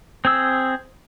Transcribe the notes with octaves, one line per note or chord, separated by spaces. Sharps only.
C4 G#4 E6